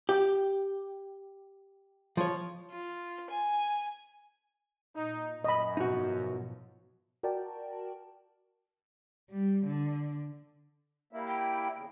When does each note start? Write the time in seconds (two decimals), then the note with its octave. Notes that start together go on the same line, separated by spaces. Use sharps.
0.09 G4
2.17 F3 C#5
2.71 F4
3.30 G#5
4.95 A#2 D#4
5.44 F#2 D#5 B5
5.77 G#2 B2 F3 D#4 F#4
7.23 F#4 A#4 D5 G5 A5
9.31 G3
9.65 D3
11.13 G3 A#3 E4
11.28 G5
11.76 E2 C#3